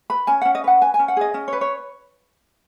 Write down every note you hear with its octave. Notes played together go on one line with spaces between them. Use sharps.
B4 B5
C#4 G#5
C#4 F#5
D#5
B4 F#5
B4 G#5
G#5
C#4
F#5
G#4 D#5
C#4 D#5
C#5
B4
C#5